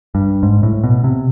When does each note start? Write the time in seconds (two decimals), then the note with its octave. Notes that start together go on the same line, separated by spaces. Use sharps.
0.15 G2
0.43 G#2
0.63 A2
0.84 B2
1.04 C3